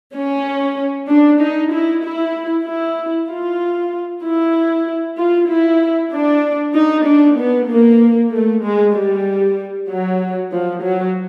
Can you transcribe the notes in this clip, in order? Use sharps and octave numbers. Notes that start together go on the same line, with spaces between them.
C#4
D4
D#4
E4
E4
E4
F4
E4
F4
E4
D4
D#4
D4
B3
A#3
A3
G#3
G3
F#3
F3
F#3